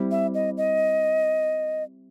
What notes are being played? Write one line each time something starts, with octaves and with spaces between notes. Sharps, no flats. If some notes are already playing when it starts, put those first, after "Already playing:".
Already playing: G3 C4 E4
E5
D#5
D#5